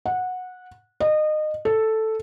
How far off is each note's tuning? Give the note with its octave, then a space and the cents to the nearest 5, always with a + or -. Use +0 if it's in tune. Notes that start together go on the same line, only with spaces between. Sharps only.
F#5 -15
D#5 -25
A4 +0